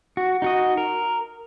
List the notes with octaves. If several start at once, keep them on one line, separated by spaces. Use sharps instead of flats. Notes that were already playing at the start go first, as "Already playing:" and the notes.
F#4
D#4 F#4 D#5
A#4